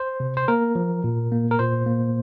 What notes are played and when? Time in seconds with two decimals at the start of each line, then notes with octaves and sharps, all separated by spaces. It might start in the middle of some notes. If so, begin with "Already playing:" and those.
Already playing: C5
0.20 C3
0.37 C5
0.48 A#3 A#4
0.75 F3
1.04 A#2
1.32 A#3
1.51 A#4
1.59 A#2 C5
1.86 A#3